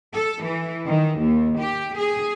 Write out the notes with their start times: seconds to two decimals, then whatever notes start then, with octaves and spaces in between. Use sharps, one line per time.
0.13 A4
0.44 E3
0.86 D#3
1.20 D#2
1.59 G4
1.96 G#4